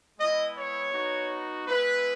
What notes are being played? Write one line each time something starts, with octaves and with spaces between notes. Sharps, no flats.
G#3 B3 E4 D#5
C#5
B3 D#4 F#4
G#3 B3 E4 B4